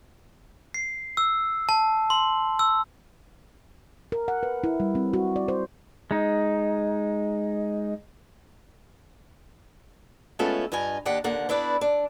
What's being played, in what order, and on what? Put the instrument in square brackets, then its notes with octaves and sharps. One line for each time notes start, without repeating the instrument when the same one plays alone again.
[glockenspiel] C7
E6
A5
C6
E6
[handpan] A#4
F#5
B4
E4
G3
C4
F#4
D5
C5
[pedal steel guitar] G#3 D#4
[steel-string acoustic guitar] G#3 A3 B3 C#4 F4 A4
G2 F4 D#5 G#5
D#2 D4 G4 D#5 F#5
D#2 D3 A#3 F#5
B3 D4 E4 B4 D5
D4